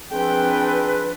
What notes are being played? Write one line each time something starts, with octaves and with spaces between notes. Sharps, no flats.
F3 C4 D4 G#4 B4 G5